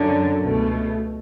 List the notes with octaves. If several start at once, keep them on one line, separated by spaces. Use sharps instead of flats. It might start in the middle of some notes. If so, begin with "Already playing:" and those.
Already playing: F#2 D3 F#3
C#2 B2 A3